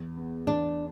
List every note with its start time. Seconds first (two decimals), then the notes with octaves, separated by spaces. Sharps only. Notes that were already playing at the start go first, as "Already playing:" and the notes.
Already playing: E2
0.16 B3
0.47 E2 D4